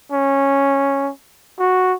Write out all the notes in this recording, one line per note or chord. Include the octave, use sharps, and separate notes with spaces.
C#4
F#4